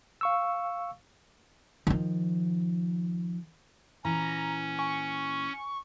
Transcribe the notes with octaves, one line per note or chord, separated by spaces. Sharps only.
F5 C#6 E6
D#3 F3
A#2 E3 C#4 A#5
G#5 C#6